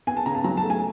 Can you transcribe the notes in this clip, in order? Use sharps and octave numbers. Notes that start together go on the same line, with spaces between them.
B3 G#5
A5
C#3 A#5
A5
F#3 A#5
A5
A3
G#5